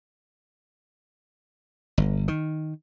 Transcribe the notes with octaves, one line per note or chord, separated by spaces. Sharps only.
G1
D#3